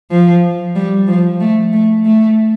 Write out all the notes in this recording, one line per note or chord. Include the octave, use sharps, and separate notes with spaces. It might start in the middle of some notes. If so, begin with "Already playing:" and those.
F3
G3
F3
A3
A3
A3